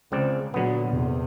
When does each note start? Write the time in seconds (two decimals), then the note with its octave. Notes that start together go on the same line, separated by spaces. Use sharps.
0.12 C#2 C#3 C4 D5
0.54 A#2 D3 F#3 B3
0.88 E2 C3